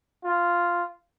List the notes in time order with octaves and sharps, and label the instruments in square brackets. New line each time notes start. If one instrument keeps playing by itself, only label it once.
[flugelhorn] F4